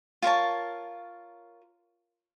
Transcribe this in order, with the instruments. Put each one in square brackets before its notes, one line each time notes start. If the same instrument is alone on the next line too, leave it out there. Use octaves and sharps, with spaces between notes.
[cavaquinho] F4 A#4 C#5 A5